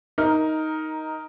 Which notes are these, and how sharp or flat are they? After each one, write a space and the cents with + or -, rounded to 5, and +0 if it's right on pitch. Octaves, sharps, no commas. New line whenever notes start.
D#4 +10 A#4 +0